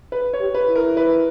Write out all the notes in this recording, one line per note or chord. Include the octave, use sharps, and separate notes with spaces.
B4
C#5
G4
B4
E4
A#4
B4